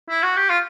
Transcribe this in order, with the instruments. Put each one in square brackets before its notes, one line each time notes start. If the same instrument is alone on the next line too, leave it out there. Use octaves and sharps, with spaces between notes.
[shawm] E4
F#4
G4
F4